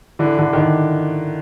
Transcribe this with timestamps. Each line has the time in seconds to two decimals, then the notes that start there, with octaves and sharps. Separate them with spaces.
0.19 D3 E3
0.38 D3 E3
0.53 D#3
0.58 D3